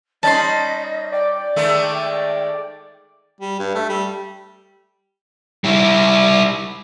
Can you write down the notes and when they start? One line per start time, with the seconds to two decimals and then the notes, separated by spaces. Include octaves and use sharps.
0.23 G3 C#4 D#4 D#5 A5 C6
1.12 D5 G5
1.56 D#3 G#3 A3
3.41 G3
3.60 G2
3.75 A3
3.89 G3
5.64 G3 E4